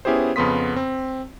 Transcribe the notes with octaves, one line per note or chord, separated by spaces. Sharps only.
B3 C#4 E4 G4 G#4 C5
F2 C#3 B3 C6 D#6 B6
C4